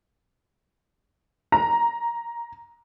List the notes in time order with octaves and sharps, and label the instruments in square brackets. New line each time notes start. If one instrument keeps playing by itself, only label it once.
[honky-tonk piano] A#5